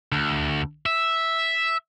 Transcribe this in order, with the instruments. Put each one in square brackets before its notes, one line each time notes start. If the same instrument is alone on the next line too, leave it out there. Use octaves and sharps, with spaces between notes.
[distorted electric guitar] D2
E5